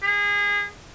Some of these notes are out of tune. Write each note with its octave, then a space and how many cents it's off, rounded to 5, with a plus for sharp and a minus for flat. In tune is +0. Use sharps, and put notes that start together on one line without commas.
G#4 -25